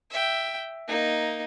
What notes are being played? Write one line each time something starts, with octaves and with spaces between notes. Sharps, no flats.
E5 G5
A#3 D#4